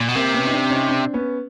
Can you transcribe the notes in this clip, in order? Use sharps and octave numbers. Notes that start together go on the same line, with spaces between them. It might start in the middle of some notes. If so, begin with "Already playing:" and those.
A#2
B2
C3 A#3 C4
B3 C#4
D#4
C4 D4
C#4 D#4
C4 D4
B3 C#4